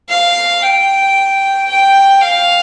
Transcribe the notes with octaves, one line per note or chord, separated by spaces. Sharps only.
F5
G5
G5
F5